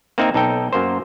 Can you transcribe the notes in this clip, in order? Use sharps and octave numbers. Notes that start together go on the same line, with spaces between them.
A#3 C4 D#4 A#4 E5
B1 D#4 A4 G5
F#2 A#3 C5